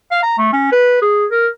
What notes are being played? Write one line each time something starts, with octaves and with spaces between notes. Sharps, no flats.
F5
A#5
A3
C#4
B4
G#4
A#4